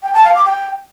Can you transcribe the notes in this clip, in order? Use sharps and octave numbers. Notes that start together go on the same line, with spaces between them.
G5
A5
F5
D6
G5